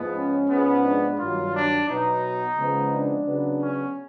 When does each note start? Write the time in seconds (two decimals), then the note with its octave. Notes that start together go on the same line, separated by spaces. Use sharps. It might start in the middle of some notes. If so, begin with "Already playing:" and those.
Already playing: G#2 F3 G#3 B3
0.14 C#4
0.49 G#2 F3 G#3 B3
0.84 D4
1.19 G2 D#3 F#3 F4
1.54 D4
1.88 B2 F#3 B3 D#4
2.57 C#3 F3 G#3 B3
2.92 D4
3.26 C#3 F#3 B3
3.61 C#4